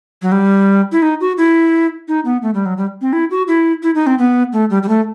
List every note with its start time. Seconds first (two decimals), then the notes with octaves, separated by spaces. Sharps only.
0.22 F#3
0.32 G3
0.92 E4
1.02 D#4
1.21 F#4
1.38 E4
2.08 D#4
2.25 B3
2.43 A3
2.54 G3
2.66 F#3
2.78 G3
3.01 C4
3.13 E4
3.31 F#4
3.48 E4
3.83 E4
3.95 D#4
4.07 C4
4.19 B3
4.53 A3
4.70 G3
4.83 G3
4.89 A3